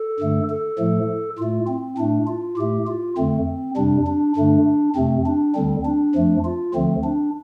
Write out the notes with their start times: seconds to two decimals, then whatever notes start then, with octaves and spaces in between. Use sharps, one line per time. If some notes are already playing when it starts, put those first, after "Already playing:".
Already playing: A4
0.20 G2 D3 A3
0.50 A4
0.79 A2 F3 A3
1.39 A2 A3 F4
1.68 C4
1.98 A2 A3 D4
2.28 F4
2.57 A2 A3 G4
2.88 F4
3.17 F2 D3 A3 C4
3.76 F2 C3 G3 D4
4.07 D4
4.36 G2 D3 A3 D4
4.96 F2 C3 A3 C4
5.26 D4
5.55 D2 D3 G3 C4
5.85 D4
6.15 F2 F3 A3
6.45 F4
6.74 D2 D3 F3 A3 C4
7.04 D4